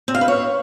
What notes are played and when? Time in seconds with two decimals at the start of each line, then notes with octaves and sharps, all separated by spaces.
0.08 C4
0.15 F5
0.21 B4
0.28 C#5